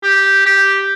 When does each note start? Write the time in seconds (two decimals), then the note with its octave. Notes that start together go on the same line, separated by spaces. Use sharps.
0.03 G4
0.46 G4